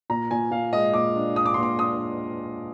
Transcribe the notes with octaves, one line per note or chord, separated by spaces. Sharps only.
A#2 A#5
A#2 G#5
A#2 F5
G#3 D#5
A#2 D6
D4
D4 D#6
D6
A#2 C6
D6
D4 D#6